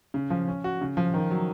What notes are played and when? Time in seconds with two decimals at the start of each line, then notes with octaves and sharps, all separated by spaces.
0.14 C#3
0.30 F3
0.48 C#4
0.64 F#4
0.81 C#3
0.97 F3
1.14 D#3
1.31 F#3